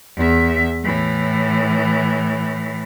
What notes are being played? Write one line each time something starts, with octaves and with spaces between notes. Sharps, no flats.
E2 E5
A2 E3